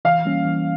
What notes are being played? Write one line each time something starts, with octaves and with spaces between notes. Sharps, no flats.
E3 F5
G3 A#3 C#4
E3